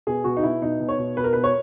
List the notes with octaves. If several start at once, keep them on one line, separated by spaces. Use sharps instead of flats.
B2 G#4
B2 F#4
D#4
B2 E4
B2 D#4
B2
C#5
B2
B2 B4
A#4
B2 B4
C#5